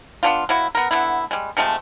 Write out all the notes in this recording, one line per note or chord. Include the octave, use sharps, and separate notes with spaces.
B3 D4 F4
F#3 A#3 E4
B3 A#4
D3 B3 E4
G3 G#3
C3 F3 G#3 A3